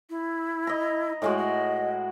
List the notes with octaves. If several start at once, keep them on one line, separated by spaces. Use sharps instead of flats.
E4
D#5 A#5
A2 G#3 F#4 D#5
D#5